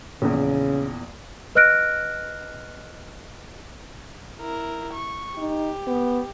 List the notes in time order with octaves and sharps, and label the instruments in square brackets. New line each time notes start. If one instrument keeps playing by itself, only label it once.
[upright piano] A#1 E2 [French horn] C#3
[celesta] B4 D#5 F6 F#6 A#6 D7
[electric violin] E4 A#4
C#6
[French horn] D#4 [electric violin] G4
[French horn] B3